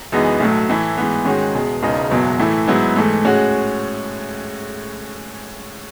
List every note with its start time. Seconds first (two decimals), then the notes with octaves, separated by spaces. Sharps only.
0.12 F#2 E3 G#3 B3 D#4
0.40 B1 A2 F#3 A3
0.69 A2 E3 A3 E4
0.97 G#2 E3 B3
1.25 G#2 D#3 G#3 C#4 F#4
1.54 E2 B2 G#3
1.83 E1 E2 C#3 G#3 D#4
2.11 F#1 E2 B2 F#3
2.39 A2 E3 A3 E4
2.67 G#2 F#3 B3 E4
2.96 G#2 E3 A3
3.25 A2 G#3 C#4 F#4